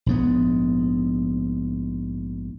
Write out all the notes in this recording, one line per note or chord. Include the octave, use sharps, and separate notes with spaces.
A#1 G#2 B3